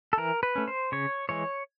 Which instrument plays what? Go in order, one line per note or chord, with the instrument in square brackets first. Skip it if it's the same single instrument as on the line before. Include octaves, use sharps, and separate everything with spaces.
[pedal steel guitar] A4
E3 A#4
B4
A3 C#4
C5
C#3 C#5
E3 G#3 C#5